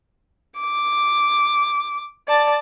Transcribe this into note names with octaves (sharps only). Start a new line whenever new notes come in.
D6
D5 A5